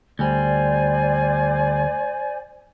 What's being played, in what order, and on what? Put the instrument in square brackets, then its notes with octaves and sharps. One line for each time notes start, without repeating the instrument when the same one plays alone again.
[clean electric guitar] D2 G3 [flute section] C5 D5 G#5